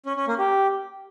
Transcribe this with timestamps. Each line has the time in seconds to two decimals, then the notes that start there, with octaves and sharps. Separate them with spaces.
0.06 C#4
0.17 C#4
0.28 A#3
0.38 G4